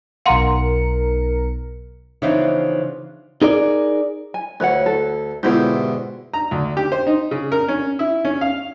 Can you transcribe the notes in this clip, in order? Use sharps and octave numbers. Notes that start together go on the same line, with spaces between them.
B1 A#4 F5 F#5 C6 C#7
C#3 E3 F3 B3 D4 D#4
D#4 G#4 A#4 D5
G#5
D2 B4 C#5 F#5
A4
G#2 B2 D3 E4 F4 G4
A#5
D2
G4
C5
D#4
C#3
A#4
C#4
E4
C#4
F5